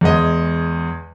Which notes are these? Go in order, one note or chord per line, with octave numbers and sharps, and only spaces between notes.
E2 G#3 D#5